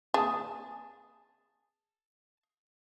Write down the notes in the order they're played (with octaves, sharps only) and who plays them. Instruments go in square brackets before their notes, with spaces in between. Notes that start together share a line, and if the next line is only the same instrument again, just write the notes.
[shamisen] G#4 [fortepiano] A5 D#6